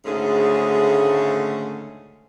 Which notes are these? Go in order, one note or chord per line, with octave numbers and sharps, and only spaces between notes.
D2 G#2 C#3 A3 G#4